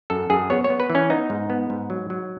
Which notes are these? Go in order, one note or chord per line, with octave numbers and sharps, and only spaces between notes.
F#2 A4
F#2 G#4
B3 C#5
C#5
B3
B4
E3
C#4
B3 D#4
G#2
B3
G#2
F#3
F#3